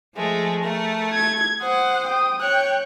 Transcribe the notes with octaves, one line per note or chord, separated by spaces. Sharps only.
F3 G#3 A3
A3 A#4
G#6
C5 F#5 D#6
G5 D#6
C#5 G5 F#6